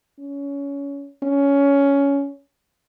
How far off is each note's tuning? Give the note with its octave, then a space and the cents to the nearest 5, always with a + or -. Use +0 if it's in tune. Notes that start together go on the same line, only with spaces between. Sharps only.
C#4 +20
C#4 +15